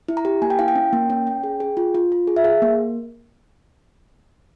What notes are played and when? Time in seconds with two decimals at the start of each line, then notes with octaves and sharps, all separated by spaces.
0.08 E4
0.17 A#5
0.25 G4
0.42 A#3 G#5
0.50 G5
0.59 E4 F5
0.68 G5
0.76 C#4
0.93 A#3
1.10 C#4
1.27 C#4
1.43 G#4
1.60 G#4
1.77 F4
1.95 F4
2.12 F4
2.27 G#4
2.36 E5
2.44 G#4 F5
2.62 A#3